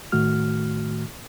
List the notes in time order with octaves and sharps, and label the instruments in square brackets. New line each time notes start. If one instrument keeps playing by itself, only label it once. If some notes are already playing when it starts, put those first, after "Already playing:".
[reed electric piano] A2 D#3 A3 F#4 F6